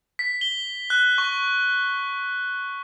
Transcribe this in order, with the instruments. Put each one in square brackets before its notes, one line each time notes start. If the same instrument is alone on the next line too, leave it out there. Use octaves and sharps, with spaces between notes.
[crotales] B6
G7
F#6
C#6